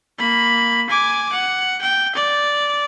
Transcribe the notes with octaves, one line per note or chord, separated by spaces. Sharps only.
A#3 B5
G#5 D6
F#5
G5
D5